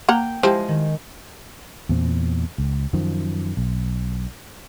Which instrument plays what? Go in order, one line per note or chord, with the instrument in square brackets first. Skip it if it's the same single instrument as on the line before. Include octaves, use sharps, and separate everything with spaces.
[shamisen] A#3 F#5 A#5 [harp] G5
[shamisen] F3 E4 G4 [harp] G#3
[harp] D#3
[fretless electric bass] E2 A#2 C4
C#2
F#2 D#3 F3
B1